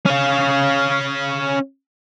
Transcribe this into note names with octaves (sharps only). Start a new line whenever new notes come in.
C#4 F5